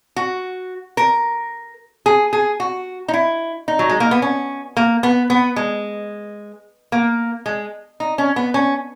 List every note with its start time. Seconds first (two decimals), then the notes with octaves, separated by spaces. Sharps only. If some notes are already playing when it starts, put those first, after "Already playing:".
0.16 F#4
0.97 A#4
2.06 G#4
2.33 G#4
2.60 F#4
3.08 D#4
3.13 E4
3.68 D#4
3.79 F#3
3.89 G#3
4.00 A#3
4.11 B3
4.22 C#4
4.77 A#3
5.03 B3
5.30 B3
5.56 G#3
6.92 A#3
7.46 G#3
8.00 D#4
8.18 C#4
8.36 B3
8.54 C#4